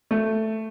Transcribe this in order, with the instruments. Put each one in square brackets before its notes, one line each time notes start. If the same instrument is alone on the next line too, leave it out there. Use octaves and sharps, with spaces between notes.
[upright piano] A3